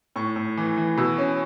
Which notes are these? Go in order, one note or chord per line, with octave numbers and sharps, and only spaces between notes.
A2 C#6
A2
E3
E3
B2 E6
C#4